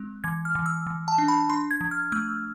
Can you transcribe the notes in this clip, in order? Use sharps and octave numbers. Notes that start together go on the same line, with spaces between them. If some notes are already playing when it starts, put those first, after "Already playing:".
Already playing: G#3 C4
E3 G#6
F6
E3
E6
E3
A5
D4
B5
D4 C6
G#6
F3
F6
A3 E6